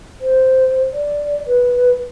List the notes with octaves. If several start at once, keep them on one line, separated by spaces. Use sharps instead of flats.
C5
D5
B4